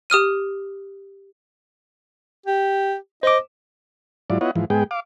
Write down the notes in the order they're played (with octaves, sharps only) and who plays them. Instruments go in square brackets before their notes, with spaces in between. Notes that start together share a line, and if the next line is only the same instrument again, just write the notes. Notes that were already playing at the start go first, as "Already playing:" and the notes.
[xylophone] G4 D#6 F6 D#7
[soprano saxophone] G4
[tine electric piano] C5 D6 [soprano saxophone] D#5
[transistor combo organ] G#2 F#3 E4 F4 D5
B3 E4 F4 C#5 D#5 F#5
G#2 E3 F3
G#2 G#3 B3 G#4 G5
F5 D6